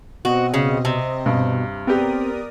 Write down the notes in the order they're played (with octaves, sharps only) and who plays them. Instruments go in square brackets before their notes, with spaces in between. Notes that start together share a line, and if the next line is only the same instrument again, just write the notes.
[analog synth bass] B2 [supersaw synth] C4 D#5 [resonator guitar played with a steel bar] F#4
[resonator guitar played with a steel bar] C#3
C3
[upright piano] G2 [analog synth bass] B2
[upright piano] B3 G4 [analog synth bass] C4 [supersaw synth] A#4 D5 D#6